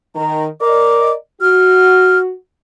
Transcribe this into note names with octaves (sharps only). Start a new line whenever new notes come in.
D#3 A#5
A#4 D5 D#5 D6
F#4 F6